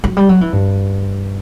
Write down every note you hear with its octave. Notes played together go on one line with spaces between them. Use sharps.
F#3
G3
F#3
E3
G2